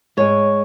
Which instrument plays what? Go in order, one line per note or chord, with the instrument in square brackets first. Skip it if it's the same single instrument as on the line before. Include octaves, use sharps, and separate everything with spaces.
[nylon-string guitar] G#2 G#3 C#5